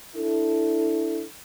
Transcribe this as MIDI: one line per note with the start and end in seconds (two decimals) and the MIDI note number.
0.16 1.24 62
0.16 1.24 64
0.16 1.24 69